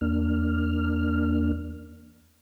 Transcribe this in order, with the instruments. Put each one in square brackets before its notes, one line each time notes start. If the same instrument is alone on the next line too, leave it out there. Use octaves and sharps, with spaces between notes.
[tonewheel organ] E2 A#3 D4 F6